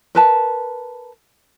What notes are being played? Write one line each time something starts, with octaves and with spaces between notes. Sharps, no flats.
A#4 B4 A5